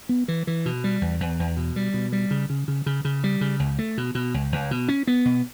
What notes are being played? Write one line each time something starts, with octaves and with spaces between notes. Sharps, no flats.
B3
E3
E3
B2
G3
E2
E2
E2
B2
G3
B2
G3
C#3
C#3
C#3
C#3
C#3
G3
C#3
C#2
A3
B2
B2
C#2
C#2
B2
C#4
B3
B2